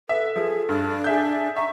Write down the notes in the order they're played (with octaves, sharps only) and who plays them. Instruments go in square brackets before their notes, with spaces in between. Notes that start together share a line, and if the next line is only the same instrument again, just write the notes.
[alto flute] A4 [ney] B4 [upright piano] E5
[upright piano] F3 [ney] G#4
[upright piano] G2 [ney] D4
[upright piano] G#4 E5 G6
[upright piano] E5 [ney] A#5 [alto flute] C#6